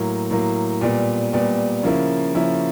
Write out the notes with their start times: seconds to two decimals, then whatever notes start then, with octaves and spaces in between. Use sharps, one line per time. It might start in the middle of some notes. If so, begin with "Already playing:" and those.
Already playing: A2 F#3 A#3
0.31 A2 F#3 A#3
0.81 A#2 G3 B3
1.33 A#2 G3 B3
1.83 C#3 F3 A#3 C#4 E4
2.34 C#3 F3 A#3 C#4 E4